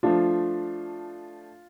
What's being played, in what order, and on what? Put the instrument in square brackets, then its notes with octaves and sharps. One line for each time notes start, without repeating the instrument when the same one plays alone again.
[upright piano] F3 A3 D4 [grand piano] F4